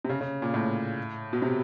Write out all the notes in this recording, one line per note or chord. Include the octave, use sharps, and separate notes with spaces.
C3
C#3
C#3
A#2
A2
B2
C3